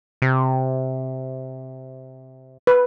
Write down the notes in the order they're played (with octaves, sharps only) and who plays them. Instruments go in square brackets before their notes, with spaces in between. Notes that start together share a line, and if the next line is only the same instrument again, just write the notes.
[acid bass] C3
[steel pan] B4